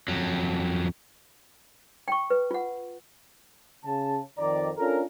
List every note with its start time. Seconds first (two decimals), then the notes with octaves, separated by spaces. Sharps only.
0.08 F2 F#3
2.08 G5 C#6
2.30 B4
2.51 F4 F#5
3.86 C#3 A5
4.38 F2 D#3 D5 A#5
4.78 C#4 D4 F4 A4 A#4